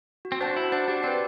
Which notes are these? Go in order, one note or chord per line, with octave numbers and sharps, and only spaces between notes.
F#4
C4
D4 C5 F#5 A5
E4 F#4
D4 C5 F#5 A5
D4 G4
C4 B4 D5